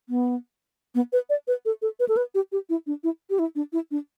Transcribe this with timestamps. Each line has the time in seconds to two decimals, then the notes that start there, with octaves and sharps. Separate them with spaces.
0.09 B3
0.95 B3
1.13 B4
1.30 D5
1.47 B4
1.65 A4
1.82 A4
2.00 B4
2.08 A4
2.17 B4
2.35 G4
2.52 G4
2.70 E4
2.87 D4
3.04 E4
3.30 G4
3.39 E4
3.55 D4
3.73 E4
3.91 D4